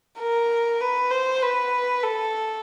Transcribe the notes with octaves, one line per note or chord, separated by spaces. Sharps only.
A#4
B4
C5
B4
A4